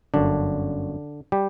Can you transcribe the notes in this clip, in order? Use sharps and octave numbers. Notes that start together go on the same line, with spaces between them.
G1 F#2 D3 D4
G3 G4